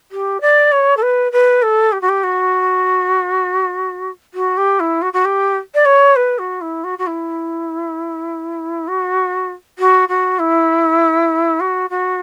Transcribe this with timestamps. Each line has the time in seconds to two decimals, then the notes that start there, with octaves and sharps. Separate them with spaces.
0.11 G4
0.41 D5
0.72 C#5
0.97 A4
1.02 B4
1.32 B4
1.62 A4
1.92 G4
2.01 F#4
2.09 G4
2.23 F#4
4.34 F#4
4.57 G4
4.80 E4
5.02 F#4
5.13 F#4
5.25 G4
5.74 D5
5.85 C#5
6.16 B4
6.38 F#4
6.61 E4
6.84 F#4
6.98 F#4
7.07 E4
8.87 F#4
9.78 F#4
10.08 F#4
10.39 E4
11.60 F#4
11.90 F#4